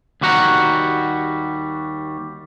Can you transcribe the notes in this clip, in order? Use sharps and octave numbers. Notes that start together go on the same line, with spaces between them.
D#2 G3 F#4 F#5 A#5